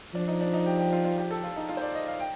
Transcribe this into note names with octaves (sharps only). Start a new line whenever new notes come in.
F3 D4
D#4
D4
D#4
G4
G4
F4
F4
G4
A4
F4
D#4
F4
C5
D5
D#5
F5
G5